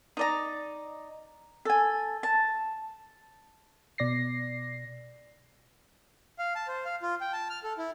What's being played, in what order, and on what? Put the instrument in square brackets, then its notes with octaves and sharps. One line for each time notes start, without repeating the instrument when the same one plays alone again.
[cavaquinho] D#4 D5 A#5
A4 G#5
A5
[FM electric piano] B2 D5 A#6 C7
[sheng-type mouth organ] F5
A5
C5
F5
F4
G5
A5
F6
A4
E4